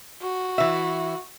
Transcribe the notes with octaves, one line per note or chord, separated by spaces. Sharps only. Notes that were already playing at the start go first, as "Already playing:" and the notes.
F#4
E3 E5